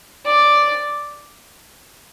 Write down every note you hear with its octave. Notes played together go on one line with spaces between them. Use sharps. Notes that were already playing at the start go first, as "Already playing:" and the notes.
D5